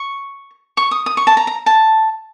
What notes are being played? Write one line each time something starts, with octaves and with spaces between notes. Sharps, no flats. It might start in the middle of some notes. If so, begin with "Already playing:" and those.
Already playing: C#6
C#6
D#6
D#6
C#6
A5
A#5
A#5
A5